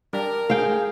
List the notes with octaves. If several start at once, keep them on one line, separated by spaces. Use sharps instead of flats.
G3 D4 G4 A#4
G#4 F5 G5